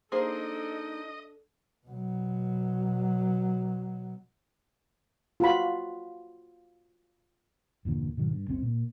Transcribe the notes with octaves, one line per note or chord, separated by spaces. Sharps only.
A#3 D4 D#4 G#4 A4 C5 D#5
B2 F#3
F4 F#4 B5
G1 E2 A#2 D3
G#2 B2 D#3 F#3
G2
F#1 C#2 C4 C#4
A#2 A#3